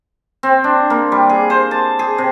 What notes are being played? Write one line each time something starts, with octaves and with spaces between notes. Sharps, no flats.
C4
D4
A#3
G3
G#4
C5
A5
G#4
C3